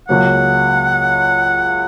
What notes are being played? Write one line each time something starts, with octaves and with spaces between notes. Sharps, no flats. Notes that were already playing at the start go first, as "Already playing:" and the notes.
C#2 C#3 F#3 A#3 F#5